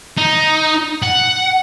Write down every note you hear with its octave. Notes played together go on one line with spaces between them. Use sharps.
D#4
F#5